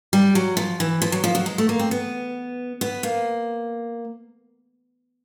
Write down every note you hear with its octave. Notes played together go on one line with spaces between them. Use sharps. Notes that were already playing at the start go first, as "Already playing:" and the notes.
G3
F#3
F3
E3
F3
F#3
F3
F#3
G#3
A3
A#3
C4
B3
B3
A#3